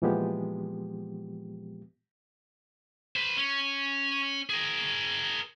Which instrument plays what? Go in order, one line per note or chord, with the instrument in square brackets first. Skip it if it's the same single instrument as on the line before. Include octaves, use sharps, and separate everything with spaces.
[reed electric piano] A#2 E3 F3 G#3 B3 G4
[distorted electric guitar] B4 C5
C#4
G#4 A#4